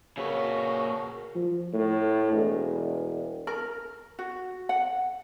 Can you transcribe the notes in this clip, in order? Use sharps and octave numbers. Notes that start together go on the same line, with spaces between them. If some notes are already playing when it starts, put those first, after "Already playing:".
A#2 C#3 F#4 A#4 B4
F3
A2
E1
A#4
F#4
F#5